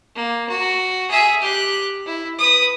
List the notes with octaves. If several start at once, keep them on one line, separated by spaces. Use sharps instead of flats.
A#3
F#4
G#4 E5
G4 F#6
E4
B4 D#6